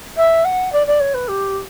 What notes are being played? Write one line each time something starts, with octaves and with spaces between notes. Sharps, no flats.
E5
F#5
D5
D5
C#5
B4
G4